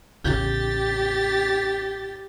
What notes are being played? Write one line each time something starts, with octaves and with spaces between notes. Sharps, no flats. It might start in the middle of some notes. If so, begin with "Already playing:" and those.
A1 E2 C#3 G4 A6